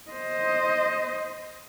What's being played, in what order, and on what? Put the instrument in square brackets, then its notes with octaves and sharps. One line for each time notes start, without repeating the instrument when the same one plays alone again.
[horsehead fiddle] C5 D#5